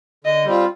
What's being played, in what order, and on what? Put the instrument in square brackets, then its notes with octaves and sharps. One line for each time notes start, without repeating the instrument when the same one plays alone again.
[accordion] D3 [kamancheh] D#5
[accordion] G3 C4 F4